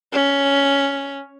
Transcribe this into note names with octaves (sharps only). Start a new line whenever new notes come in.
C#4